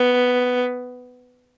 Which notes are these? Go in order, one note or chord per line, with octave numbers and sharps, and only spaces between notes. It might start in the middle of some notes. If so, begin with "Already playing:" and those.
Already playing: B3